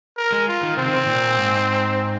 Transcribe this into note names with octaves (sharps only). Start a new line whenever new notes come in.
A#4
G#3
F4
D#3
C3 C4
D#3
C3
A#2
G#2